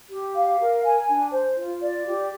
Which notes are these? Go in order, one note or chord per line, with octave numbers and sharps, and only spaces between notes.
G4
F5
A#4
G#5
D4
C5
F4
D5
G4